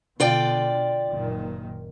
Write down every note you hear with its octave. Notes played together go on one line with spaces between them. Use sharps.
B2 D3 F4 D5 G5
F#1 A#2 D#3